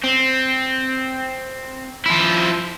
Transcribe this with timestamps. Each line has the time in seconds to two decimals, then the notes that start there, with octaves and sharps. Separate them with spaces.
0.04 C4
2.06 F3 E4